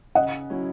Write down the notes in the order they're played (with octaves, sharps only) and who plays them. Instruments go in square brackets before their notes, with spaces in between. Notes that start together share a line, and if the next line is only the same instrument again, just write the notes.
[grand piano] C#3 [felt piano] D#5 F#5
[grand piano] F#3 C#4 E4